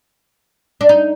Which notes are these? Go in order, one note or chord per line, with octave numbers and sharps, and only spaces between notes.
D4
D#4